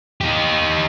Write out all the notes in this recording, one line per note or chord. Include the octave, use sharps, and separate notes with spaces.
D#4 G4